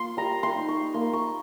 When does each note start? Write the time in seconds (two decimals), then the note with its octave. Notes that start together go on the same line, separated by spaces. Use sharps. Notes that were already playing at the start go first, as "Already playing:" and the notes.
Already playing: A#3 F4 C6
0.17 G3 A#5
0.43 C6
0.56 D#4
0.68 C#6
0.94 A#3 C6
1.13 C#6